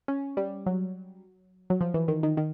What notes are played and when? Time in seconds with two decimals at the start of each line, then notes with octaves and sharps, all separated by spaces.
0.08 C#4
0.37 G3
0.66 F#3
1.70 F#3
1.81 F3
1.94 E3
2.08 D#3
2.23 D#3
2.37 D#3